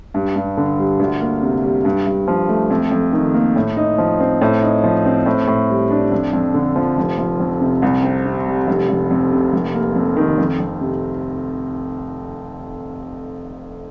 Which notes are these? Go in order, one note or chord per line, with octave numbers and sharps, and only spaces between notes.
G2
G2
D3
G3
D2
A#3
C3
G3
G2
G2
F3
A3
F2
F2
D#3
A#3
A2
D#4
F3
C4
A2
D#4
F3
C4
A2
A2
G3
D4
F2
F2
D3
F3
F1
F3
F2
C3
C2
C4
C3
G3
F1
F1
F2
C3
F1
A#3
F2
D#3
F2
F2
C3